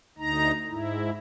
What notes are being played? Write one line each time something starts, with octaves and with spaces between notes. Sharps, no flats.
D2 D#4 A#5
G#2 E4